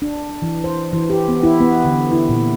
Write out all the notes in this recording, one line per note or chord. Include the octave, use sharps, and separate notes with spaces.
D4
E3
C5
E3
G4
B3
E4
B3
D3
E4
A#2